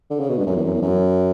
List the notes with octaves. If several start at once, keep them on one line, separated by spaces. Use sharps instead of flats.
D3
C#3
B2
G2
F#2
E2
F#2
E2
F#2